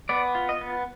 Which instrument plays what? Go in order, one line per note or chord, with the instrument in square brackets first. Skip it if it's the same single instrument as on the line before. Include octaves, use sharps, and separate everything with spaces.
[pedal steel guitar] B3 D5
F4
D#5
B3